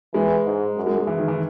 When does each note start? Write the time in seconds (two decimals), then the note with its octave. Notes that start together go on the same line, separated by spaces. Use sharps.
0.14 E3 G#3
0.45 G#2
0.76 F#2
0.86 G#3
0.97 G#3
1.07 E3
1.18 D#3
1.28 E3